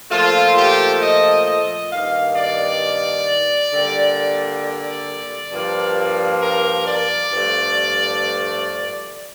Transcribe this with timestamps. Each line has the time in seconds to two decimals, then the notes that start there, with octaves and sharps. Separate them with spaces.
0.10 A#2 F3 A3 F4
0.57 G4
1.01 D#5
1.46 D#5
1.91 G2 D#3 A#3 F5
2.36 D5
3.72 D3 G3 A#3
4.61 D5
5.52 G2 F3 A#3
6.42 A#4
6.87 D5
7.32 G2 F3 A3